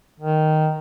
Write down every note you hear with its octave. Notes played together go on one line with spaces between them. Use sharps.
D#3